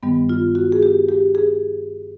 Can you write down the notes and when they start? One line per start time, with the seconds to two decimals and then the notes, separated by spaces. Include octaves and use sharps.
0.03 G2 D#3 G3 B3
0.29 F4
0.55 F#4
0.72 G#4
0.83 G4
1.09 G4
1.35 G#4